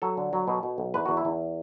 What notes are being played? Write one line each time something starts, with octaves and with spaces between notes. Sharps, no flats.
F#3 A4
D3
F#3
B2
B2
B1
E2 B4
E2 F#4
E4
E2